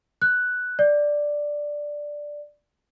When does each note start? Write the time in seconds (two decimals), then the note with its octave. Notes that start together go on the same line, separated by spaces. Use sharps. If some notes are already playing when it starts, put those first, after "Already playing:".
0.22 F#6
0.79 D5